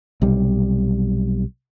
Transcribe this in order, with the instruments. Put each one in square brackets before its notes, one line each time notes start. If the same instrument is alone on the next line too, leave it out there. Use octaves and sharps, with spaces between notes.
[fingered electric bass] B1 C3 G3